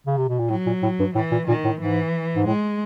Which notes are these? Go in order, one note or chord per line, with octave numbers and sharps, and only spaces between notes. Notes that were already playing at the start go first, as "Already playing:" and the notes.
C#3
C3
B2
A#2
A2 F#3
A#2
A2
G2
A2 E3
A#2
A#2 D#3
A2
G#2 E3
G#2
A2 G#3